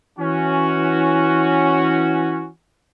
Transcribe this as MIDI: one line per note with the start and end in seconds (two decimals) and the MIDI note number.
0.18 2.48 52
0.18 2.48 61
0.18 2.48 66